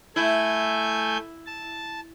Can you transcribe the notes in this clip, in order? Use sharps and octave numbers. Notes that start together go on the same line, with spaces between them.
A3 E4 G#5 G6
A5